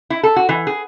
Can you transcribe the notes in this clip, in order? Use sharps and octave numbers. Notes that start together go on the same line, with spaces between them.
E4
A4
F#4
E3
G#4